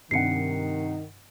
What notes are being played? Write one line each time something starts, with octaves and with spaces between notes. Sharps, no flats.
G2 C3 D#3 F#5 C7 C#7